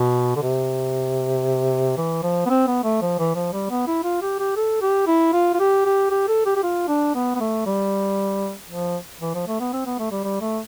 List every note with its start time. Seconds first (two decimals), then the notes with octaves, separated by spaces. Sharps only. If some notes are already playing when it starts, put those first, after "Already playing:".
Already playing: B2
0.36 D3
0.42 C3
1.97 E3
2.23 F3
2.46 B3
2.50 C4
2.67 B3
2.84 A3
3.02 F3
3.19 E3
3.35 F3
3.53 G3
3.70 B3
3.87 E4
4.04 F4
4.22 G4
4.39 G4
4.56 A4
4.82 G4
5.07 E4
5.33 F4
5.54 F4
5.60 G4
5.85 G4
6.11 G4
6.28 A4
6.46 G4
6.56 G4
6.63 F4
6.88 D4
7.15 B3
7.35 B3
7.40 A3
7.66 G3
8.70 F3
9.21 E3
9.35 F3
9.47 A3
9.60 B3
9.73 C4
9.86 B3
9.99 A3
10.11 G3
10.24 G3
10.41 A3